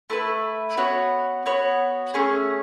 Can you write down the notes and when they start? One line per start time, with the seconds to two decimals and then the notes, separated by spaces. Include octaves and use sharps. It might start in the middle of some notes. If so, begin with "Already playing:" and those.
0.10 A3 E4 B4
0.77 B3 F#4 C#5
1.46 B3 F#4 C#5
2.14 A3 C#4 G#4